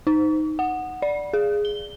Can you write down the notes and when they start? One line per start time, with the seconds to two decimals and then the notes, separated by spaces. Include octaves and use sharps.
0.07 D#4
0.59 F#5
1.02 D5
1.33 G#4
1.65 G7